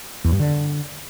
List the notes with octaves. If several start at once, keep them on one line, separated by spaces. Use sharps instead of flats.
E2
G2
D3